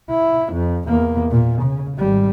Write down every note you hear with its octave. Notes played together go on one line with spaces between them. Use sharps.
E4
F2
E2 A#3
A#2
C#3
G#1 G3